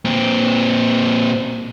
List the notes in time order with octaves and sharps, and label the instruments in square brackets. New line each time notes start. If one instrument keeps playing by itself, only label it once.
[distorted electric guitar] A#2 C4